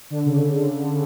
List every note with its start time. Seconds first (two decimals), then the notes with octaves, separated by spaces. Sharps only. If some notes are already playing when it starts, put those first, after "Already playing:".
0.10 D3
0.25 C#3